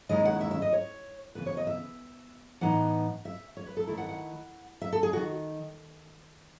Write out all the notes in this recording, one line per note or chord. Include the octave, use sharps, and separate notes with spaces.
D#2 D#3 G#3 C#4 E4 D#5
F#5
E5
E5
D#5
C#5
C#3 E3 B3 B4
C#5
D#5
E5
A2 E3 B3 D#4 F#5
E5
C#5
B4
A4
D#3 A3 E4
F#5
F#5
E5
A4
G#4
D#3 F#4